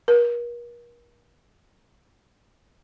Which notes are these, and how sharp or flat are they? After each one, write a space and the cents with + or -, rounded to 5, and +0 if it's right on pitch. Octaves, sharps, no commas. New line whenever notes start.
A#4 +40